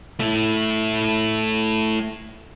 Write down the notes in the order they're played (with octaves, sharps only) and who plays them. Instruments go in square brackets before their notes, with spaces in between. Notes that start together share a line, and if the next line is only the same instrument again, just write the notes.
[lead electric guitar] A3 E4